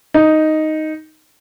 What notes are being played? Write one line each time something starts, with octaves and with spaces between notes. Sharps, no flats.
D#4